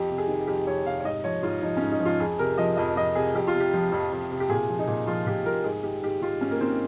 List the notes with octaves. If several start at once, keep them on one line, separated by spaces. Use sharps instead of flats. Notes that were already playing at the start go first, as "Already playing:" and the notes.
Already playing: F2 G4
C3
G#4
D#3
F2 G4
F2 C#5
C3 F5
C#5
G#2 D#5
F3 C#5
G#2 F4
F3 D#4
C#4
G#2
D#4
F3
F4
F2 G#4
C3 A#4
F3 D#5
F2 D#5
F2 D#5
C3 G#4
F2 G4
F4
C3
G4
F3
F2
F2
C3
G4
A#2 G#4
F3
D#4
A#2
F3 F4
A#2 G4
F3 A#4
G#2 G#4
D#3 G4
G#2 G4
D#3 F4
G#2 C#4
A#3
D#3 C4